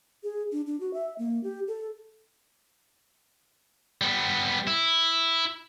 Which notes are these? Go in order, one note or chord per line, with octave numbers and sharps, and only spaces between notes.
G#4
D4
D4
F#4
E5
A#3
G4
A4
G3 B3
E4